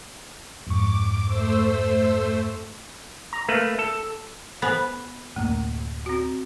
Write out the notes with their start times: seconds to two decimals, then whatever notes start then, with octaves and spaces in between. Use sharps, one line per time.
0.67 F2 G#2 C#6 D6
1.24 A3 C5 E6
3.33 A#5
3.49 A3 A#3 B4
3.79 A4
4.62 B3 C5 G#5 B5
5.36 D1 F#2 A3 A#3
6.06 C4 F#4